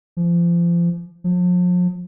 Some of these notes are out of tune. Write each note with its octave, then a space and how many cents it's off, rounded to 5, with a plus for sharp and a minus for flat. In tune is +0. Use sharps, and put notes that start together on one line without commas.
F3 -30
F3 +40